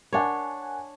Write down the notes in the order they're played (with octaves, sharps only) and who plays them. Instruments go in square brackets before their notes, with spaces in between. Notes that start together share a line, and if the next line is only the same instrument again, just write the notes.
[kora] D4 C#5 [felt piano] A#4 F#5 G#5